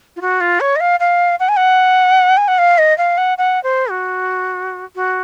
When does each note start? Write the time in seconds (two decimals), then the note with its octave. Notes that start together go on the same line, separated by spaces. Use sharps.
0.16 F4
0.21 F#4
0.41 F4
0.60 C#5
0.76 D#5
0.80 F5
1.00 F5
1.40 F#5
1.49 G#5
1.57 F#5
2.37 G#5
2.48 F#5
2.58 F5
2.78 D#5
2.98 F5
3.18 F#5
3.38 F#5
3.63 C5
3.90 F#4
4.95 F#4